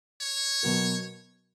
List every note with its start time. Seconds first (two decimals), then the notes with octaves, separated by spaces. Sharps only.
0.21 C#5
0.63 B2 F#3 B3 F#4 A#4